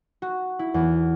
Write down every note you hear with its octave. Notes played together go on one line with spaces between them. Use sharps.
F#4
E4
E2